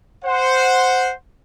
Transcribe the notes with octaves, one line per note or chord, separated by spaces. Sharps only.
C5 F#5